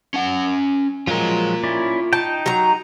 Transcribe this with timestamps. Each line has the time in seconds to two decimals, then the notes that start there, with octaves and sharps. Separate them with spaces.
0.14 C#4 F#5
1.07 F3 F#3 G#3 F4 A#4
1.64 C#4 E4 D5
2.13 D#4 G5 A5
2.46 F#3 A#5